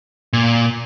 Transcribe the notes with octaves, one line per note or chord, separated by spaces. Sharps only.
A#2